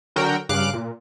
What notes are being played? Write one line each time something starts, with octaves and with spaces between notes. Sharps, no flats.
D3 F#3 F#4 A#4 G5
G2 C#3 F5 D6 F#6
A#2